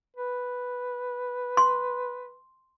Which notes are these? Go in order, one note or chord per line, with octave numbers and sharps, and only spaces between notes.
B4
C6